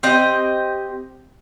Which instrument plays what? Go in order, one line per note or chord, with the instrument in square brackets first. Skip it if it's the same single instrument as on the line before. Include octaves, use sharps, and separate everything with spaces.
[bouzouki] C4 G4 D#5 G5